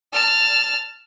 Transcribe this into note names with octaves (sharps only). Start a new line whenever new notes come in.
A5 F6